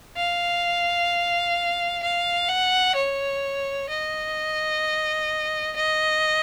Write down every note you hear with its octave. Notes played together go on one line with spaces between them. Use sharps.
F5
F5
F#5
C#5
D#5
D#5